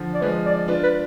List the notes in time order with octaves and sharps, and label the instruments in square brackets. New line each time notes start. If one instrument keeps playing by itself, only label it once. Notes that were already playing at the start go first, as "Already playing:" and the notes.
Already playing: [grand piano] D3 F3
[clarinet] D5
[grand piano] F3 G#3 [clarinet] B4
[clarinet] D5
[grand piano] D4 F4 [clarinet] B4
[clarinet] B4